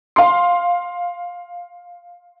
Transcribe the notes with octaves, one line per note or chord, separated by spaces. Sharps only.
F5 C6